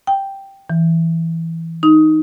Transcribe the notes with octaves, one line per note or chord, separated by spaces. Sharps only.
G5
E3
D#4